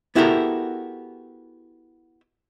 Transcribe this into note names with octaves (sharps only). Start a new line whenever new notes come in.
B3 E4 F#4 G4 A4 A#4